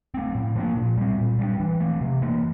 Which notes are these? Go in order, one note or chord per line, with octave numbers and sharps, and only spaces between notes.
A3 C4
A2
F3 A#3 D4
A#2
G3 C4
A#2
G3 A#3 D4
E3
A3 C4
C3
E3 A#3